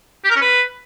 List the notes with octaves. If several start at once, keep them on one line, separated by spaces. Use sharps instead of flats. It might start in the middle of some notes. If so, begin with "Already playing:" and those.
G4
A#4
C#4
B4